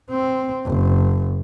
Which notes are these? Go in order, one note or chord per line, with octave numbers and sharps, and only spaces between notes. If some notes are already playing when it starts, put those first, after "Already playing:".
C4
F#1